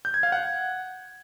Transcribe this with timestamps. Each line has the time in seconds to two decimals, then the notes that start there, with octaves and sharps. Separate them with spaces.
0.05 G6
0.14 G#6
0.23 F5
0.32 F#5